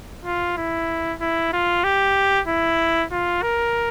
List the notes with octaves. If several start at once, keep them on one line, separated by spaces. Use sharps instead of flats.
F4
E4
E4
F4
G4
E4
F4
A#4